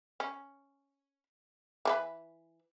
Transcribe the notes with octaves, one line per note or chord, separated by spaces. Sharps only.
C#4
E3 G#4 B4